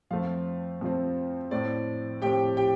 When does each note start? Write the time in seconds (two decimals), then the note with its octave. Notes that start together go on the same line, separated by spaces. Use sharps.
0.11 F2 F3 A3 C4 F4 F5
0.81 F2 F3 A3 C4
1.51 A2 A3 C4 D5
2.22 A2 A3 C4 G4 G5
2.57 G4 G5